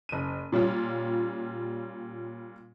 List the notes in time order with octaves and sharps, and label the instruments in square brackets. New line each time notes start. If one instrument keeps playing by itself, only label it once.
[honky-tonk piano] F#1 D#7
A#2 G3 C#4 F4